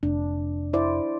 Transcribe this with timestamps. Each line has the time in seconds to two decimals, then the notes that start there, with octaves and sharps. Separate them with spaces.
0.03 F1 D4
0.73 E4 C5 D5